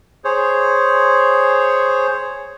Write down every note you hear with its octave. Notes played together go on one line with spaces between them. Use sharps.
G#4 C5 C#5